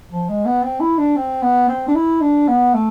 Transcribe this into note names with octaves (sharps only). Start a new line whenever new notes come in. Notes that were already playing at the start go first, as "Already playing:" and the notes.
F3
G#3
B3
C4
E4
D4
C4
B3
C4
D4
E4
D4
B3
A3